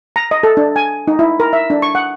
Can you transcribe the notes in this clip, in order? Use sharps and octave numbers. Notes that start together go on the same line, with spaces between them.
A#5
D#5
A4
D4
G#5
D#4
E4
A#4
E5
D4
C#6
F#5